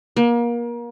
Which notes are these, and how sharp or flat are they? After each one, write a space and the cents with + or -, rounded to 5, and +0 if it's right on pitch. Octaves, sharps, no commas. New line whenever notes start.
A#3 +30